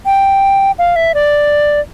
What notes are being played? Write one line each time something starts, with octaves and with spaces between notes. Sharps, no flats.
G5
F5
E5
D5